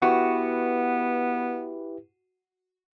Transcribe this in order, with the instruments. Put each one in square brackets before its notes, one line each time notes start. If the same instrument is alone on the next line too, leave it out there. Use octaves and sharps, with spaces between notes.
[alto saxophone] B3 [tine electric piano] E4 G4 B4 [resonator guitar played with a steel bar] F#4